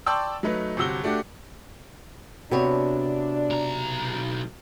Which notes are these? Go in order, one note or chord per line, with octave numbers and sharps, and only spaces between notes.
D5 G5 A5 C6 C#6 E6
F#3 A3 D#4 B4
G1 C3 F#4 E6 G7
A3 D4 F#4 G4
C3 B3 D4 F#4 C#5
B1 A#5